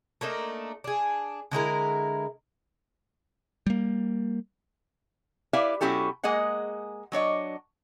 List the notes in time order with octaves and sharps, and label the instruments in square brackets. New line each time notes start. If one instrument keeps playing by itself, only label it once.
[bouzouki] A3 A#3 D4 D#4
D4 G#4
D3 G#3 E4 A#4
[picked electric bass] G3 A#3
[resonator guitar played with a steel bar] E4 G4 B4 D5 E5 F5
B2 F#3 C#4 E4 G4 A4
G#3 A#3 G#4 D#5 F#5
F#3 D4 C#5 D#5